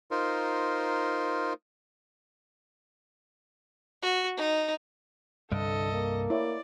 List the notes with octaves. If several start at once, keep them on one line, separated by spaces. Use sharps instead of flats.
D#4 F4 A#4 C5
F#4
D#4
C2 G2 D3 A4 D#5
A#3
E4 C#5 D5